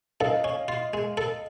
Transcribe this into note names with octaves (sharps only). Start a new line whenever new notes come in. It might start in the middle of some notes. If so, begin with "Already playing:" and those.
A4 D#5 F5
C#4
F4
G#3
A4